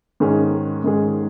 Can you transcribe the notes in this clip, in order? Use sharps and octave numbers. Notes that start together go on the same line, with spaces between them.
G#2 D#3 G#3 C#4 G#4
G#2 D#3 G#3 C#4 G#4